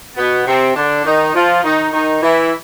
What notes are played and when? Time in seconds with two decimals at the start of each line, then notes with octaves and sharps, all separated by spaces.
0.16 B2 B3
0.47 C3 C4
0.75 D3 D4
1.05 D#3 D#4
1.34 F3 F4
1.64 D#3 D#4
1.93 D#3 D#4
2.23 E3 E4